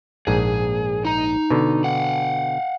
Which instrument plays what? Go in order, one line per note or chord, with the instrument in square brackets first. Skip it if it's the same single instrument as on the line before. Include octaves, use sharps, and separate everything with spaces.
[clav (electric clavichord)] A#1 G#2 [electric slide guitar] G#4
[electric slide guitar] D#4 A#5
[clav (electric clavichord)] B2 D3
[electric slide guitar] F5 F#5